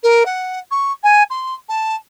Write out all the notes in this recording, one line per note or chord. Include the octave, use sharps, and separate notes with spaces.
A#4
F#5
C#6
G#5
C6
A5